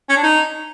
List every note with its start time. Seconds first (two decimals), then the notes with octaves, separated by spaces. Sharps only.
0.09 C#4
0.17 D4
0.24 D#4